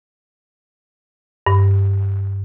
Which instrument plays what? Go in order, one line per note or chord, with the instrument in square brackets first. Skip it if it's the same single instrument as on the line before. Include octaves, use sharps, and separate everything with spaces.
[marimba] G2